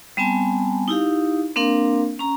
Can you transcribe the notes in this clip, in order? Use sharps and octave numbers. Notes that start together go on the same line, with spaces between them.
G3 B3 C4 G#5 A5
D#4 E4 G4 F5
A#3 C4 D4 A#4 F5
C#4 A#5